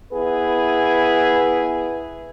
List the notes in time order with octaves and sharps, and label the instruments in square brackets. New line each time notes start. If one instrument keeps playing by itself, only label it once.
[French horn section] B3 E4 G#4 B4